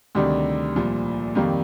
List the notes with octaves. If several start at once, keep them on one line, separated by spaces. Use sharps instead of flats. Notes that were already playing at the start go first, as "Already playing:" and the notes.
D2 C3 D#3 G3 D4
C2 A#2 F3
F2 D#3 G3 A#3